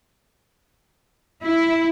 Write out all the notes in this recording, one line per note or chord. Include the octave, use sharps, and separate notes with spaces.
E4